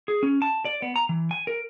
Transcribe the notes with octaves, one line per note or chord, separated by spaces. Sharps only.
G#4
C#4
A5
D5
B3
A#5
E3
G#5
A#4